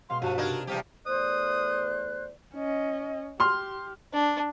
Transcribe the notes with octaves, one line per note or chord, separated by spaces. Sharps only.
B2 G#3 F5 C6
G2 F3 F#4 A5
C3 D4 D#4 A#4 G#6 E7
E2 F3 G3 G4
E2 A3 C5 D5 D#6 F#6
C#4 D#5
G4 C6 F6
D4